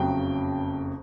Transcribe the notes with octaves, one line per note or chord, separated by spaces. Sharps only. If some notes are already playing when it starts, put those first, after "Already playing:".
Already playing: F#1 F2 C#3 F#3 G5